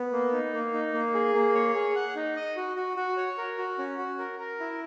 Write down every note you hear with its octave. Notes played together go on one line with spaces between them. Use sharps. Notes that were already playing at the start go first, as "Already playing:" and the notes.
Already playing: B3
A#3
D#4
A#3
D#4
A#3
G#4
A#3
C#5
G#4
F#5
D#4
D#5
F#4
F#4
F#4
C#5
A#4
F#4
C#4
F#4
A#4
A#4
E4